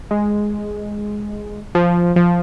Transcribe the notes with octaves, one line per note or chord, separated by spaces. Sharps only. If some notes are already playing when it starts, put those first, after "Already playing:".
G#3
F3
F3